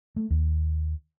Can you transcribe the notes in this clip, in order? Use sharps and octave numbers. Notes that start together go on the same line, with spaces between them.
A3
D#2